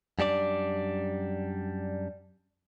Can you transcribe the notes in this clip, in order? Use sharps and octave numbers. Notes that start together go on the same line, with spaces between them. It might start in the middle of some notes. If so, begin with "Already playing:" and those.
F#2 G3 D4 D5